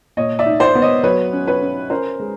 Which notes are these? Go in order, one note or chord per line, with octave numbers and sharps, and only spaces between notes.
A#2 C#5 D#5
D5 E5
D#4
C5 D5
B3
C#5 D#5
F#3 B4 C#5
C#4
B4 C#5
C#4
C#4 A#4 C5
G#3